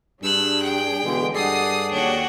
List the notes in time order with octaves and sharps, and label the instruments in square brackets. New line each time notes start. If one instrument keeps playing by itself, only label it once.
[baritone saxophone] G2 [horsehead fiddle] D4 G#4 [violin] E6 F#6
[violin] G5
[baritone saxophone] B2 [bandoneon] D3 E3 G#3
[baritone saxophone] G2 [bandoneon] G#4 A4 D5 [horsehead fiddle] D#5 F#5 [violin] D#6 C7
[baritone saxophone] D#2 [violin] D4 F#4 [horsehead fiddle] C#5 G5